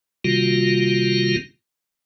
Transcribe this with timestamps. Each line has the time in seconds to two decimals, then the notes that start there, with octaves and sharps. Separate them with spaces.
0.24 C3 D#3 G3 A#3 F4 F#4